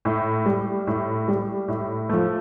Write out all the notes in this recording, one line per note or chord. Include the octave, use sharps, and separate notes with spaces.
A2
G3
A2
G3
A2
F3 A3